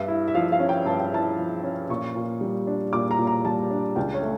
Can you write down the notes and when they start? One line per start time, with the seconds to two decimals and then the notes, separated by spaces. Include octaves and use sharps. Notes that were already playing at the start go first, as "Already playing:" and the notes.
Already playing: G2 E5
0.08 E4
0.28 E5
0.35 F3 F5
0.52 F5
0.60 C#4
0.69 G5
0.86 G2 A5
1.00 G5
1.13 E4 A5
1.38 F3
1.63 C#4
1.89 A#2 C#6
2.15 A#2
2.41 G3
2.67 D4
2.93 A#2 D6
3.11 A#5
3.18 A#2
3.27 A#5
3.45 G3 A5
3.71 D4
3.96 C#2 G5
4.14 C#5
4.22 A3